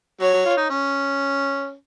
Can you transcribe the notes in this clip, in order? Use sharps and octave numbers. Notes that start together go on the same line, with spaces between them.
F#3 C#5
F#3
F4
D#4
C#4